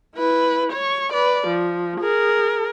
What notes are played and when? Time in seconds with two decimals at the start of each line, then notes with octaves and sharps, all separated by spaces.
0.16 E4 B4
0.72 C#5 C#6
1.13 B4 D5
1.47 F3
2.00 G#4 A#4